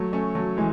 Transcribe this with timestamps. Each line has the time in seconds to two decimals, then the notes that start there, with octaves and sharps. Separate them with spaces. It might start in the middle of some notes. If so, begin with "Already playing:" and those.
Already playing: F#3 A3
0.13 A3 C#4
0.35 F#3 A3
0.57 E3 G#3